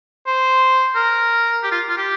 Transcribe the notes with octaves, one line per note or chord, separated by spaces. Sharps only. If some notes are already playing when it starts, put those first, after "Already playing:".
C5
A#4
G4
F4
F4
G4